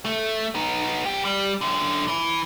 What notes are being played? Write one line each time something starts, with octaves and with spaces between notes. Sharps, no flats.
A3
B3 D#4
B1 G4
G3
F#2 D3
E3